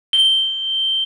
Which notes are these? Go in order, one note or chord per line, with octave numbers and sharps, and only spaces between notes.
G7